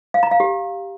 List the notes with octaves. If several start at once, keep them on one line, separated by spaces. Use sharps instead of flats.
F5
A#5
F5
G4